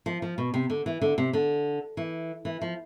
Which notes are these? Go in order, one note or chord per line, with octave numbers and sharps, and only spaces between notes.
F3
F3
B2
C3
D3
E3
D3
C3
D3
E3
E3
F3